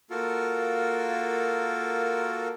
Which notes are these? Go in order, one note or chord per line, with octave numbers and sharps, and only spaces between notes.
A#3 F4 F#4 A4 A#4